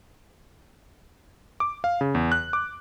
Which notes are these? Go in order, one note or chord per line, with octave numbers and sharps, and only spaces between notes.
D6
F5
C#3
E2
F#6
D6